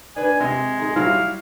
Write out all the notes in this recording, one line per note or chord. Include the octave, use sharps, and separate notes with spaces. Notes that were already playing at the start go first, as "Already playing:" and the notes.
D4 B4 G#5
C3 G#3
D#4 G#4
F#3 G3 E4 F5